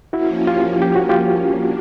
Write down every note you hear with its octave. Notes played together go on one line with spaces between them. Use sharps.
F3 A#3 C#4 E4 F#4
F4 G4
G4
F#4
F4 G4
D4